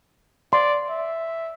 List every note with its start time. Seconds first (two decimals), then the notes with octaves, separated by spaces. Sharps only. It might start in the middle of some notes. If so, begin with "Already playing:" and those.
0.53 D5 C6
0.89 E5